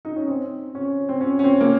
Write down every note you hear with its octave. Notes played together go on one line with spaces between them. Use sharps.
D#4
C#4
C4
C#4
C4
C#4
C#4
C4
A#3